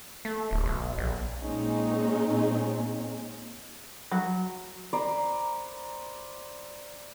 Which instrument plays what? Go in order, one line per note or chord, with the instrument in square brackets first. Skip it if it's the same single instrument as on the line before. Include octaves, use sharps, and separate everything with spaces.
[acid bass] A3
D1
B1
A#1
[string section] A#2 G#3 C4 C#4 D#4
[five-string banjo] F#3
[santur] C5 D5 A#5 B5